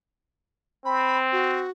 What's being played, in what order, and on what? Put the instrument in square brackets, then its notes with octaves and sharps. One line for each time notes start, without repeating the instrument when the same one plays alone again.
[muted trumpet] C4 [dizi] B5
[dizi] F#4